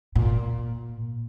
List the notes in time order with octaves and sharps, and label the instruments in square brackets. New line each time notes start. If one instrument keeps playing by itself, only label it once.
[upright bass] A#2